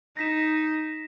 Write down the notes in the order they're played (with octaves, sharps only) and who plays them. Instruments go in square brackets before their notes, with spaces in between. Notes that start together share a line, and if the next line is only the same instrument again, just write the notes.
[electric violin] D#4 [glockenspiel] A#6 B6 E7